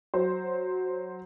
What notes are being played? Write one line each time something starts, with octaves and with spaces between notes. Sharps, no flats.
F#3 C5